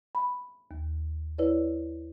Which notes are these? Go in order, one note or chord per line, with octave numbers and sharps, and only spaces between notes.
B5
D#2
E4 B4 C#5 D5